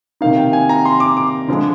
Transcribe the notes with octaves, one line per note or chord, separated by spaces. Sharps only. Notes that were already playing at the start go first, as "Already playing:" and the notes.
C3 D#3 A#3 D#4 F5
G5
G#5
A#5
C6
D6
D6
D3 F3 G#3